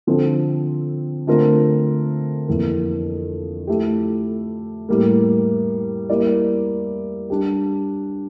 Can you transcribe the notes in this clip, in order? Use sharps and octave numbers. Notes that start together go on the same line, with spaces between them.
D3 F3 C4 F4 A4
D3 A3 C4 F4 A#4
F2 E3 A#3
F3 A3 E4 G4
A2 G3 A#3
G3 A#3 E4 A#4 D5
G3 D4 G4